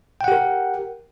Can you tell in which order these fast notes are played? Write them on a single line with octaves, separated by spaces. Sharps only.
G5 F#5 G4 A#4